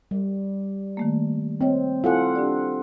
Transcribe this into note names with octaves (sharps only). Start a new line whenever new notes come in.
G3
D#3 A3 A#3
C4 C#5 D#5 G5
E4 F4 A4 F#5 G#5
D4 G4 D5